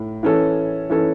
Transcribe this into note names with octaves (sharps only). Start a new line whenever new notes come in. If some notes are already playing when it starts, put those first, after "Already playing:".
Already playing: A2
E3 C#4 A4
E3 C#4 A4